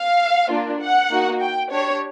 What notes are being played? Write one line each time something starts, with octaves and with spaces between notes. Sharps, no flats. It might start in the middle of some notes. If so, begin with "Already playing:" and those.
Already playing: F5
A#3 D4 F4
F#5
A#3 D#4 F#4
G5
D4 G4 C#5